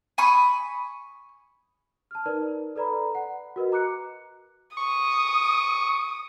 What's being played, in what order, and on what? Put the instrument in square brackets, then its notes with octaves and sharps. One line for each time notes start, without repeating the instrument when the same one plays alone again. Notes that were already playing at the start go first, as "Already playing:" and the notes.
[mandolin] G#5 B5 C#6 D#6
[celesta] A5 F6
D#4 A#4 B4 D5
A4 B4 D5 A#5 B5
F#5
F#4 A#4 B4 D#5
A#5 D6 F#6 C#7
[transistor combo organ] C#6 [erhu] D#6